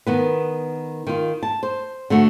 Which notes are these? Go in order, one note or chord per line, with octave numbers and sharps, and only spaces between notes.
D#3 B3 B4
D#3 F4
A5
C5
D3 A3 F#4